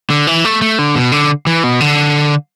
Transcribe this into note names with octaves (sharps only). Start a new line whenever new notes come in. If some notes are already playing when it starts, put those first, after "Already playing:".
D3
E3
A3
A3
D3
B2
D3
E3
B2
D3